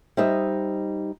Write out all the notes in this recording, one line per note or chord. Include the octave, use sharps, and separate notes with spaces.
G3 D#4 C5 D#5 E5